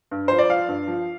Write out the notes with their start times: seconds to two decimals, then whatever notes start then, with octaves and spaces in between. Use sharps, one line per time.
0.11 G2
0.28 F3 C5
0.39 D5
0.49 F3 F5
0.68 G2
0.88 F3